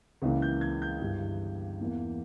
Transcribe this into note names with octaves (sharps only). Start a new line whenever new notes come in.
C#2 C#3 E3 A#3
G6
G#6
G6
G1 G2 E3
E2 E3 A#3